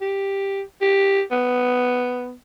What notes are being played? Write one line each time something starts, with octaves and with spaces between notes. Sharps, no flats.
G4
G4
B3